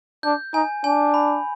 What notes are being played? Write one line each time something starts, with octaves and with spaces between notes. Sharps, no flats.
D4 G6
D#4 G#5
D4 G#5
B5